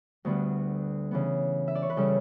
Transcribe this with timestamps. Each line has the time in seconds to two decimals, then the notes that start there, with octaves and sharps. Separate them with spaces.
0.25 D2 D3 G3 B3
1.11 C#3 E3 B3
1.68 E5
1.75 D5
1.82 C#5
1.90 B4
1.97 C#3 G3 C#4 A4